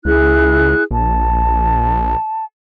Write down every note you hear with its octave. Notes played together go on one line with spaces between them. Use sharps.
C#2 E4 G#4 F#6
A#1 A5